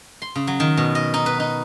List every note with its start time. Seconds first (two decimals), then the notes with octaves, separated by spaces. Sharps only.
0.22 C6
0.35 C#3
0.47 F#3
0.60 D#3
0.77 B2
0.95 D#5
1.14 D#4
1.26 B4
1.40 D#4